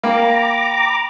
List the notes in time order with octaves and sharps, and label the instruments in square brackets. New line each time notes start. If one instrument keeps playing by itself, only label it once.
[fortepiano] A#3 [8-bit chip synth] G5 B5 [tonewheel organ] A#5 D6